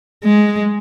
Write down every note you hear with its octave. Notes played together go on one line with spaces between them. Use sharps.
G#3